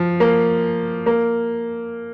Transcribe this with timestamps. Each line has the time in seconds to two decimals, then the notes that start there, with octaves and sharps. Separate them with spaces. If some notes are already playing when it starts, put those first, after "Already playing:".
Already playing: F3
0.20 A#3
1.06 A#3